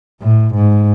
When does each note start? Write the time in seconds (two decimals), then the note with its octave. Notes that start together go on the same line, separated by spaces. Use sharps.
0.22 A2
0.55 G#2